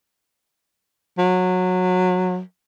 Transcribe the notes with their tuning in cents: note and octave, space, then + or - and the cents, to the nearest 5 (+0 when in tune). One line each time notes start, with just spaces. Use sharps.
F#3 -20